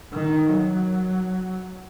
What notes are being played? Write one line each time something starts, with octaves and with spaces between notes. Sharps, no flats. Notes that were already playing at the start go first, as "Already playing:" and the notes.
D#3
F#3